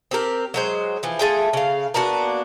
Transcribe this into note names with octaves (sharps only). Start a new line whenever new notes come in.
C4 G4 A#4
F#3 G#3 C5
E3 F3
A3 F4 G#4 G5
C#3 F5
A#3 B3 D4 F#4